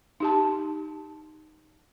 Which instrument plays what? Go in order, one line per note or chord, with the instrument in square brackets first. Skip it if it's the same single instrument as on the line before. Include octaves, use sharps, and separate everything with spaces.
[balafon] D#4 G4 A5